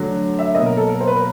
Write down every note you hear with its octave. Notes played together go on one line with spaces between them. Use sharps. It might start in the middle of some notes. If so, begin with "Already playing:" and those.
Already playing: D3 F#3 A3
E5
B2 F#3 A#3 D#5
A#4
A4
A#4
C5
B4
A#4